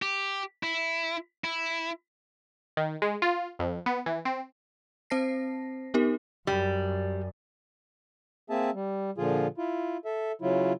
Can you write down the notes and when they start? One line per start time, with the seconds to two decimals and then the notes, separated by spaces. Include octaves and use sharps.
0.02 G4
0.63 E4
1.44 E4
2.77 D#3
3.02 G#3
3.22 F4
3.59 F2
3.86 B3
4.06 E3
4.25 C4
5.10 C4 C5 A5 A#6 C7
5.94 B3 D#4 G4 A#4
6.47 F#2 G3
8.50 A#3 C4 G#4 E5 A5
8.74 G3
9.18 A#2 D3 F3 F4 G#4
9.58 E4 F4
10.05 A4 E5
10.42 C#3 F#3 E4 F4